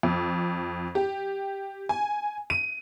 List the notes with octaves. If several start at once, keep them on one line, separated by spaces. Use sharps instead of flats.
F2
G4
G#5
D#7